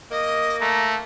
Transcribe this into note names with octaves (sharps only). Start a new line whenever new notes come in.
A#3 D#5
A3 F5 A#5